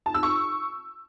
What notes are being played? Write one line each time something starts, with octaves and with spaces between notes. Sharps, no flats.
A5
E6
C#6